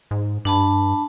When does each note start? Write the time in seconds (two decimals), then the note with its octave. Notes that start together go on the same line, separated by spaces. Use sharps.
0.11 G#2
0.45 G2 D4 A5 B5